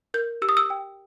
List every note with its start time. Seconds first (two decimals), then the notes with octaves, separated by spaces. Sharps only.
0.14 A#4 G6
0.42 G4 E6
0.49 D#6
0.57 E6
0.70 G5